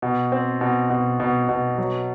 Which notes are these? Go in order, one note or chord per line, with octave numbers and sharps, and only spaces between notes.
B2
C4
B2
B2
B2
B2
F#3